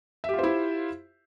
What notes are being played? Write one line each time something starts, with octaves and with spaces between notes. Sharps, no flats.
E4 F4 G4 C5 E5